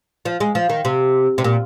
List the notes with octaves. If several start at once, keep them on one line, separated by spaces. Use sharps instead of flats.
F3
G#3
F3
D#3
C3
C3
A#2